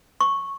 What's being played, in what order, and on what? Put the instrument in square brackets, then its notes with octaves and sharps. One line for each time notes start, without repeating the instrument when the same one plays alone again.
[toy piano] C#6